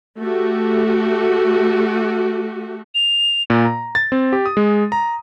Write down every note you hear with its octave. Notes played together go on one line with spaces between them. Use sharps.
A3 F#4 G4
F7
A#2
A#5
A6
C4
G4
D#6
G#3
A#5